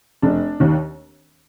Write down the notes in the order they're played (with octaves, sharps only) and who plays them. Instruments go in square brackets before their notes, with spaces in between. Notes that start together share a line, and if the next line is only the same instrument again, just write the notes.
[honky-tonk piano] F1 D4
D#2 D#3